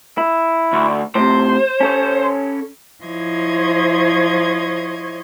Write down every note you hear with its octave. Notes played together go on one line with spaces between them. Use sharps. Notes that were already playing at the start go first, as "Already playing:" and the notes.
E4
D2
A2 C3 C5
C#4 A4 C#5
F3 E4 C5 C#5 D#5 G#6